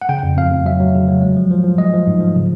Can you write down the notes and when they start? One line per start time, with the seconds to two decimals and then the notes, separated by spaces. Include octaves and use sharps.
0.02 F#5
0.09 C#3 G5
0.23 F2
0.37 F2 F5
0.51 F2
0.65 F#3 E5
0.80 F#3
0.95 C#3
1.08 F#3
1.22 G#3
1.37 F3
1.51 F3
1.64 F3
1.78 G#3 D#5
1.93 F3
2.07 G#2
2.21 F3
2.36 C#3